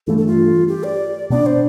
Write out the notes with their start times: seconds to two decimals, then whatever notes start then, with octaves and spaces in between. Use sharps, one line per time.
0.07 G2 E3 A3 A4
0.18 A4
0.27 F4
0.68 G4
0.84 D5
1.30 B2 B3 D4 D5
1.46 C5